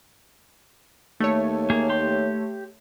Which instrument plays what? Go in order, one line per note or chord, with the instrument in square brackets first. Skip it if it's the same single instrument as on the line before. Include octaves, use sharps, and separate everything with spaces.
[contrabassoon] D#2 [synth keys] A3 C#5
[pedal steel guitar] A#3 G#4
G4 C6